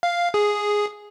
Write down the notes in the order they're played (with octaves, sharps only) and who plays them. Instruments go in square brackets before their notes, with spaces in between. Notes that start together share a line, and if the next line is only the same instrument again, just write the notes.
[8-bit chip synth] F5
G#4